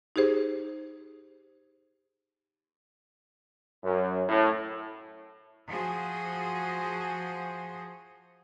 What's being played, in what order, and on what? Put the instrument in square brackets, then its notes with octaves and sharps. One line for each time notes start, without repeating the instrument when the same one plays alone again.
[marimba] D#4 G4 G#4 C5
[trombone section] F#2
A2
[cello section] F3 F#4 G#4 C5